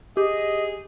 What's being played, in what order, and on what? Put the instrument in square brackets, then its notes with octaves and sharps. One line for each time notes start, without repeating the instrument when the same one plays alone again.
[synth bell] G4 [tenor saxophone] G#4 [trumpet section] D#5